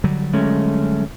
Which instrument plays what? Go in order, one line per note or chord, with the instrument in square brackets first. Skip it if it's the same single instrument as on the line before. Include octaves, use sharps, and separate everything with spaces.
[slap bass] D3 F#3 G3
[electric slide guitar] G#3 A3 C#4